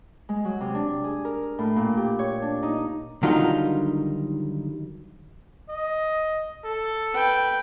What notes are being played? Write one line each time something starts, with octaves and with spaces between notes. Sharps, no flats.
G#3
F#3
C3
D4
G#4
A#4
A2
A#2
G4
C#5
D4
D#4
D3 D#3 F#3 G3 D#4 F4
D#5
A4
B4 G5